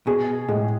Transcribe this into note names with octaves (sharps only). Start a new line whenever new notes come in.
B2 G#4
A2 G#3